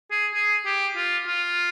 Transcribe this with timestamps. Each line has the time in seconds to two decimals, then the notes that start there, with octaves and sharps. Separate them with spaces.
0.11 G#4
0.34 G#4
0.66 G4
0.96 F4
1.28 F4